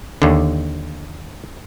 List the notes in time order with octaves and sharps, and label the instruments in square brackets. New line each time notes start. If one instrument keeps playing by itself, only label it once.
[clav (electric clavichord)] D#2 D3